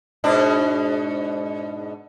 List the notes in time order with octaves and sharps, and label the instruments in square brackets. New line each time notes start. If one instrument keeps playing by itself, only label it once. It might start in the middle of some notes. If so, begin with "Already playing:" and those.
[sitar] G#2 B2 D4